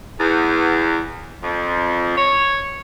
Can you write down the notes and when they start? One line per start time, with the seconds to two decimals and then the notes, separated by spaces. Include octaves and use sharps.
0.21 E2
1.43 F2
2.16 C#5